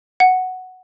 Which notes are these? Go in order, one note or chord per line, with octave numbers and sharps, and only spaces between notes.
F#5